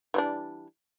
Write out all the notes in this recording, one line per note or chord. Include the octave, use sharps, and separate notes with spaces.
E3 G3 D4